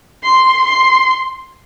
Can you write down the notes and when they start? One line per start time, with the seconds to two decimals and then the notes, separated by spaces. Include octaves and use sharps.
0.23 C6
0.65 C6